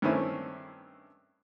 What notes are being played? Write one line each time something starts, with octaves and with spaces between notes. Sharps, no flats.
G2 D#3 A3 C4 C#4 E4